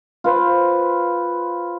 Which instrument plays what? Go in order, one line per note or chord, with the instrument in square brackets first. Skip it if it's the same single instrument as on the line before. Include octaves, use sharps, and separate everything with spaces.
[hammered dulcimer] F4 B4 C5